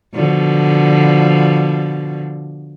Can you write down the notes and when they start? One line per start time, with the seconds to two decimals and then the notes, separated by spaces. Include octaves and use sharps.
0.14 B2 D3 F3